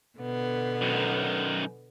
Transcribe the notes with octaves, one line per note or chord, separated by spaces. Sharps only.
B2 D3 B3
F#2 D#3